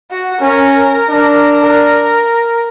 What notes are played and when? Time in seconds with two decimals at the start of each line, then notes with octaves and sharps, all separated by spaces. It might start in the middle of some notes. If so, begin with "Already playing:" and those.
0.11 F#4
0.41 C#4 A#4
1.10 D4
1.62 A#4